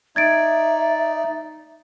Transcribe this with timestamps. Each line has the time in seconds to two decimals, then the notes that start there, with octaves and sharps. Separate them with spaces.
0.16 D#4 D5 E5 G#6 A6 D7